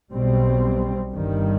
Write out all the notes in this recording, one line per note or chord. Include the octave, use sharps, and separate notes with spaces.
B1 B2 G3 C4
G1 G2 D#3 G3